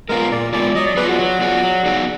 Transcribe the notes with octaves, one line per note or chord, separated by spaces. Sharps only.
G#3 B3 F4 A#4
A#2 D5
G#3 B3 F4 D5
F#3 D#5
D5
B3 F4 G#4 B4 D5
F#4
F#3
B3 F4 G#4 D5
F#3
B3 D#4 G#4 D5